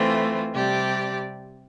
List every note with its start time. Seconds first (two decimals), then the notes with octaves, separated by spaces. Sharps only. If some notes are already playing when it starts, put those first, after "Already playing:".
Already playing: E3 A3 C4 F4
0.52 C3 G3 C4 G4 D5